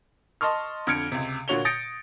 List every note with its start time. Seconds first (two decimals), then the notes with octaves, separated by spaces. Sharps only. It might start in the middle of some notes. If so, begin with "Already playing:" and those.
0.41 D#5 A5 C6 C#6 F6
0.87 F2 D3 F6 G#6 C#7 D7
1.12 C#2 C3
1.48 A#2 D3 F#4 C#5 F7 G7
1.65 D#6 G6 A6 A#6 C#7 D7